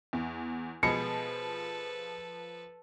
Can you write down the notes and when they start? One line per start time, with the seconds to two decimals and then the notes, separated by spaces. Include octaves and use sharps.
0.13 E2
0.83 B2 F3 G#3 A4 B4 C#7